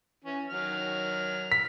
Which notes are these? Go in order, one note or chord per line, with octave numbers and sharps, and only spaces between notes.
E3 C#4
D#3 F#3 F6
B6